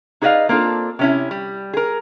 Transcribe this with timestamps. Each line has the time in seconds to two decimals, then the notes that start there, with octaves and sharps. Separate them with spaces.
0.22 D#4 G#4 B4 D5 D#5 F5
0.49 A#3 C4 D4 F4 A4
0.99 C3 C#4 E4
1.31 G3
1.73 G#4 A#4